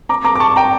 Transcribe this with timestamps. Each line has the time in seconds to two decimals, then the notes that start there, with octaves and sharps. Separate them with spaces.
0.09 A#5 D6
0.25 A#5 D6
0.36 D6
0.40 A5 C#6
0.56 G5 A#5